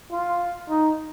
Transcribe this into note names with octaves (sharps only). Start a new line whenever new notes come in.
F4
D#4